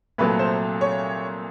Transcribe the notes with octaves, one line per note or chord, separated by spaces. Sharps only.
C2 A#2 F#3 A3 B4
C5
C#5